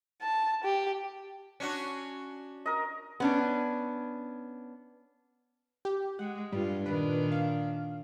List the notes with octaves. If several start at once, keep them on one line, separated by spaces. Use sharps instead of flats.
A5
G4
C#4 D4 F#4
A#4 D#5
B3 C#4 D4
G4
G#3 F#5
G2 G3 F4
A#2 D#3 D4 B4
F5